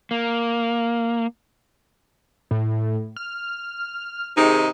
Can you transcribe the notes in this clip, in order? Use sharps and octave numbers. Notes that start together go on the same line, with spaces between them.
A#3
A2
F6
C3 D#3 D#4 G#4